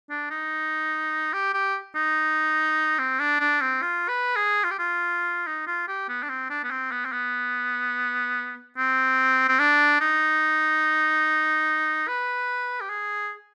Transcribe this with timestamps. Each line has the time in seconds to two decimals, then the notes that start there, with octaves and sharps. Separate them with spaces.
0.09 D4
0.30 D#4
1.33 G4
1.54 G4
1.95 D#4
2.98 C4
3.19 D4
3.40 D4
3.61 C4
3.82 F4
4.08 B4
4.36 G#4
4.64 F4
4.71 G4
4.78 F4
5.47 D#4
5.67 F4
5.88 G4
6.08 B3
6.23 D4
6.29 C4
6.50 D4
6.64 B3
6.71 C4
6.91 B3
7.05 C4
7.12 B3
8.77 C4
9.48 C4
9.59 D4
10.01 D#4
12.08 B4
12.81 G4
12.89 G#4